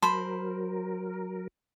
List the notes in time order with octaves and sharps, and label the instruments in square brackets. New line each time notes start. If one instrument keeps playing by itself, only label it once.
[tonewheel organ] F#3 A#4 [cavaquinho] C5 B5 [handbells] A5 C6